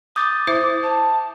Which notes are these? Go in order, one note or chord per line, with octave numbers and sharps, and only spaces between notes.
D6 D#6 G6 A6
E4 C5 E5
A5